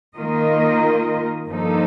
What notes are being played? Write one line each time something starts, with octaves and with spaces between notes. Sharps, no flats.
D#3 A#3 F4 A#4 D#5
G2 F3 A#3 D#4 A4